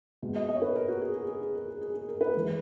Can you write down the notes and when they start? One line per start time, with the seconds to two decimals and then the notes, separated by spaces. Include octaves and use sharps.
0.22 B2 G#3
0.36 D#5
0.49 D#5
0.55 C#5
0.62 B4
0.75 A#4
0.88 F#4
1.02 G#4
1.15 G#4
1.28 G#4
1.42 G#4
1.55 A#4
1.68 G#4
1.81 G#4
1.94 G#4
2.09 A#4
2.21 B4
2.35 E3 G#3